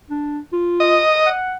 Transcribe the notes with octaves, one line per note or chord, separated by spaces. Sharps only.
D4
F4
D#5
F#5